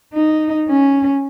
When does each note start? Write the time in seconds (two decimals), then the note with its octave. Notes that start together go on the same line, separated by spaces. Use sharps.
0.14 D#4
0.69 C#4